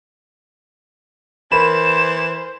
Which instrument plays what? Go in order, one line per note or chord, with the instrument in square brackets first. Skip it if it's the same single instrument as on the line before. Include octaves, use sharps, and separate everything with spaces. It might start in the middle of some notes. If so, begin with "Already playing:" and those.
[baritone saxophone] E3 [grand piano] A#4 B5 [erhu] C5 [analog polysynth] E7